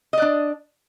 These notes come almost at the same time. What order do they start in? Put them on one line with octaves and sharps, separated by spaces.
D#5 D5 D4